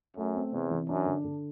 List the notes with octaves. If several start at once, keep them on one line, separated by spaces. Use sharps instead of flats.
F#2 A3
C4
E2 C3
E3
F#2 D4
D3
D3